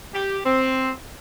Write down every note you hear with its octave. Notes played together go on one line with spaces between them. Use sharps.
G4
C4